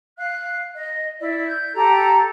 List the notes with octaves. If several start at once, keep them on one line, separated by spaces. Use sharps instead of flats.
F5 F#6
D#5
E4 D5
G6
G4 A4 A#5